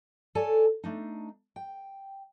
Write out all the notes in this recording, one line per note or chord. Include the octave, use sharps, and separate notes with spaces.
A4 C#5 D5 G#5 A5
A3 D4 D#4
G5